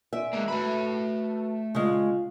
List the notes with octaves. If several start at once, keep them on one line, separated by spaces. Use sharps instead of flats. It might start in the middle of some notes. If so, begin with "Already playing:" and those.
C4 D5 E5 G#5
G#3 A#3 E6
A3 F#4 B4 B5
C#3 G#3 F4 F5